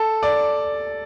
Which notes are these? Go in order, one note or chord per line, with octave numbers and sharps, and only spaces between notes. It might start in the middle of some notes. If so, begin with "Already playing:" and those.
Already playing: A4
D5